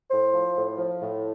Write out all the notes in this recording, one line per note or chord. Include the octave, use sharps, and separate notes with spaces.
A2 C5
F3
A2
F3
A2